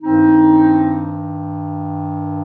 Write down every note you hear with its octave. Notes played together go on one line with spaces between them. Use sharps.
G2 D#3 C4 D#4